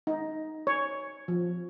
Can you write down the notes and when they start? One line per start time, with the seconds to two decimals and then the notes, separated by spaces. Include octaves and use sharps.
0.07 D#4
0.67 C#5
1.28 F3